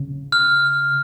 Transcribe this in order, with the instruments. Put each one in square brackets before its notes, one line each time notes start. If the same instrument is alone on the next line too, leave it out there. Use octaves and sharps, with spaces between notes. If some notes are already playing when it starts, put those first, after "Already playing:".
Already playing: [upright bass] C#3
[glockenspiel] F6